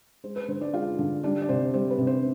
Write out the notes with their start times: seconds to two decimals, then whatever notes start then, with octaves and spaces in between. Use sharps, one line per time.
0.24 G#3 C5
0.36 B4
0.48 D3 C5
0.61 D4 D5
0.74 G#3 F4 F5
0.99 D3
1.23 G3 D4 D5
1.42 D5
1.49 C3 C5
1.74 G3 C5
1.90 B4
1.98 C3
2.07 C5